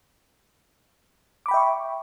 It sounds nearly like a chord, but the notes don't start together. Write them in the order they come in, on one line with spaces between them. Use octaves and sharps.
D6 B5 G5 E5 C#6